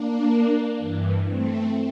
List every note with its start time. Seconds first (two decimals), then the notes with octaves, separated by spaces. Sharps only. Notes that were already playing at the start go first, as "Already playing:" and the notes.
Already playing: A#3 D4
0.77 G2 E3
1.27 A3 C4